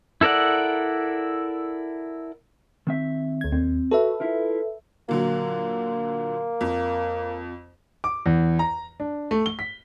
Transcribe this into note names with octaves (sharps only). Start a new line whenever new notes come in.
E4 A4 A#4 D5 F#5
D#3 C4 E5
D2 G#6
D#2 C4
F#4 A4 B4 E5
E4 F4 A#4
A#2 D3 F#3 A#3
F2
D6
E2
A#5
D4
A3
G7
B6